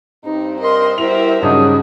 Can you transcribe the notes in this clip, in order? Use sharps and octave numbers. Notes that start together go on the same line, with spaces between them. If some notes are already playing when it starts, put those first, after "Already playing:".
G2 C4 D#4
A#4 D#5 C6
B2 G3 E4 A#4 C5 E5 F7
G2 C#3 F#3 D4 D#4 F#4 D#6